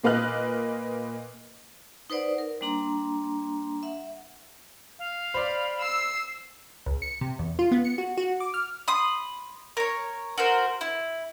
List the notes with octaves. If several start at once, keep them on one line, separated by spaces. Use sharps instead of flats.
A#2 A#3 B4 D#5 F6 F#6
D#4 B4 C5 D5 F#5
A#4
G3 A#3 D4 A#5 C6
E5 F#5
F5
C5 D5 B5
E6 C7
C#2
C#7
C3
E2
F4
B3
C#7
F#4
F#4
D6
F6
B5 C6 D#6
A#4 C#5
F#4 A#4 C5
E4